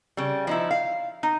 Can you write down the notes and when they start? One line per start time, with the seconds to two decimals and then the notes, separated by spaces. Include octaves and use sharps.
0.17 C#3 G3
0.47 F3 D#4 E4
0.71 F5
1.23 D#4